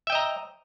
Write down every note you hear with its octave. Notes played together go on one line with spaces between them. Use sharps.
D#5 E5 G5 A#5